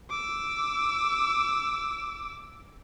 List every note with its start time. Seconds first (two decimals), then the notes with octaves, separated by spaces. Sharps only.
0.10 D6 E6